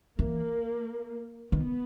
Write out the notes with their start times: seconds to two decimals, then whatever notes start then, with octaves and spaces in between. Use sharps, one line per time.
0.19 E3 A#3
1.52 D#3 B3